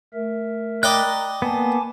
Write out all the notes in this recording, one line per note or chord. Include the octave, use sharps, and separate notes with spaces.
A3 A#4 E5
D5 D#5 G5 A#5 B5 F#6
A#3 B3 G#5 A5 D6